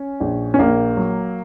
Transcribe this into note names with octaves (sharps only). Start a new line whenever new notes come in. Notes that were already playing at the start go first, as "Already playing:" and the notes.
Already playing: C#4
A#1
C#4
A#1 A#3
F#3